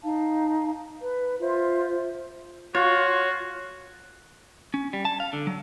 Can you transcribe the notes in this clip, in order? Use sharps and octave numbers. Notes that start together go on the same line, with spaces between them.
D#4 F5 A5
B4
F4 C5 E5
F4 F#4 C#5
C#4
G3
A5
F5
D3
F#3